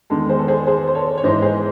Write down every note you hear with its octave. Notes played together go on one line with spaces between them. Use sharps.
E2 D#3 G#3 A4
G#4 C5
A4
G#4 C5
G#4 C5
C5
A4 C#5
C#5
G#2 E3 G#3 C5 D#5
G#4 C5